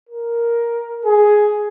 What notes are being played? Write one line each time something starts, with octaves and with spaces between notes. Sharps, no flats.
A#4
G#4